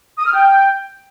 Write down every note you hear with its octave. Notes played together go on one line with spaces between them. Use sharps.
D#6
F6
G5